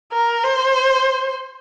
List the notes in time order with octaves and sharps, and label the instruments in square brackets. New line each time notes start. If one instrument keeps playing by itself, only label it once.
[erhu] A#4
C5